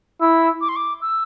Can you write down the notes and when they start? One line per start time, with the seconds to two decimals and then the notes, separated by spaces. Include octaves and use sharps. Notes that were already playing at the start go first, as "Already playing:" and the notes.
0.20 E4 E6
0.61 D6
0.69 C6
0.76 D6
1.01 E6